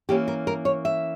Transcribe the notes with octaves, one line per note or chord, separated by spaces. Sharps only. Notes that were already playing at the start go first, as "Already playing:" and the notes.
E3 A#3 C#4 G4
A#4
A#4
C#5
E5